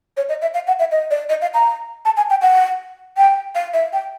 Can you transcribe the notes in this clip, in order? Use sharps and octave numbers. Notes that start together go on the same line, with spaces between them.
C#5
D#5
E5
F5
F#5
E5
D#5
D5
D#5
F5
A#5
A5
G#5
G5
F#5
G5
F5
E5
G5